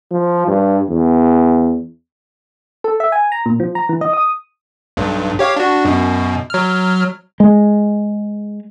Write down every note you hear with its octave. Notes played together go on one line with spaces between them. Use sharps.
F3
G2
E2
A4
E5
G#5
A#5
A#2
F3
A#5
E3
D#5
D#6
B1 G2
G4 C#5 F5
D4 F#4
F#2 B2
F#3 F6
G#3